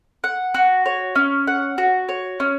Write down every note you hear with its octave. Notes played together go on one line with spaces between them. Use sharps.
F#5
F#4
C#5
C#4
F#5
F#4
C#5
C#4